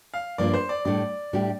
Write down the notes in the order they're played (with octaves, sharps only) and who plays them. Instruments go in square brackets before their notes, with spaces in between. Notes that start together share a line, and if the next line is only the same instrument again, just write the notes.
[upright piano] F5
[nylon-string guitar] G2 F3 A#3 F4 [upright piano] D5
[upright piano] C5
D5
[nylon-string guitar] A2 G3 D4 G4 [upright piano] D5
[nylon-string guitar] A2 G3 D4 G4